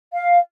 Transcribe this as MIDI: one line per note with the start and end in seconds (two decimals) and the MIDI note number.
0.13 0.38 77